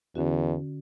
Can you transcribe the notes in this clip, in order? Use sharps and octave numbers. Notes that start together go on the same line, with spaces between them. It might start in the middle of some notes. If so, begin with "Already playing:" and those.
E2 D3 C#4 F#4